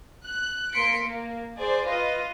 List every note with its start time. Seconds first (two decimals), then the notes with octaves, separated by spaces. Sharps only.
0.24 F#6
0.72 A#3 C6 B6 C#7 D7
1.02 A#3
1.56 G#4 C5 D5
1.85 F4 B4 D#5